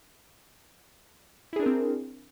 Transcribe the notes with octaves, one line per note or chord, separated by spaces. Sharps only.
C4 D4 E4 G#4 A#4